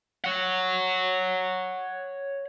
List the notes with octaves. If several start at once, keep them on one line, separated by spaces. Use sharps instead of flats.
C#5 F#5